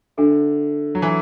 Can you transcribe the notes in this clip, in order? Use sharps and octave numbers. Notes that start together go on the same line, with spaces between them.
D3 D4 F#4 A4 E5
F#3
E3